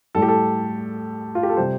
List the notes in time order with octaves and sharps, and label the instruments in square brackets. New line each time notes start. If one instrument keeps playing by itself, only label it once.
[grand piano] A2 G3 A4
G4
A4
F4
G4
A4
C3 G3 C5